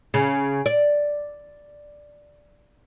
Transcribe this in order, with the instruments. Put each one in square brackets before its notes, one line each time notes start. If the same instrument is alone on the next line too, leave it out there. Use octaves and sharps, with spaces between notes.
[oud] C#3
D5